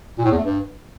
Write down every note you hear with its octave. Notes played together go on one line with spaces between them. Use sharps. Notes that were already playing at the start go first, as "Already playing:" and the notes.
A#2
A2
E2
A3
G2